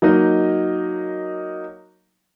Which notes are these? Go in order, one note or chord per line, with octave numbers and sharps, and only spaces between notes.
F#3 A#3 D#4 D#5